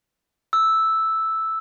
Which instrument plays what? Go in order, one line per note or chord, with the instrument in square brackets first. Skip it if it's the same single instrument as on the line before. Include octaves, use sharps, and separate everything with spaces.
[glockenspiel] E6